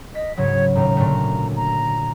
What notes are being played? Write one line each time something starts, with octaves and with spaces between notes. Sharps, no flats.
D#5 B6
G#2 C#3 F#3 C#5
D#2 A2 A#5
A#2 D3 A3
A#5